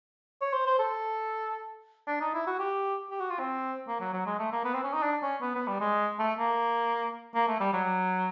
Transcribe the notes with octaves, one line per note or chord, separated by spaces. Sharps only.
C#5
C5
C5
A4
D4
D#4
E4
F#4
G4
G4
F#4
F4
C4
A#3
F#3
F#3
G#3
A3
A#3
B3
C4
C#4
D#4
D4
C#4
B3
B3
G3
G#3
A3
A#3
A#3
A3
G3
F#3